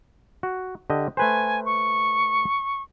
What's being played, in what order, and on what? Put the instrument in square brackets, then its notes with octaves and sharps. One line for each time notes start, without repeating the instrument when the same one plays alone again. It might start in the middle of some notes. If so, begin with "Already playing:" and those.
[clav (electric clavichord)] F#4
D3 G4 D#5
[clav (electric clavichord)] A3 B4 C5 [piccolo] G#5
[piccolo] C#6